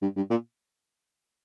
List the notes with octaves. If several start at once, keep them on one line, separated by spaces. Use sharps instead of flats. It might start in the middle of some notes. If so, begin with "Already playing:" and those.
G2
G2
A#2